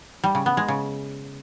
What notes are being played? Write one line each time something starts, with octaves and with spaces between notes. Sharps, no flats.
G3
C#3
B3
G#3
C#3